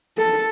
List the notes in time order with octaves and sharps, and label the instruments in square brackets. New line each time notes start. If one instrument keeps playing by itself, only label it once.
[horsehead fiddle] A4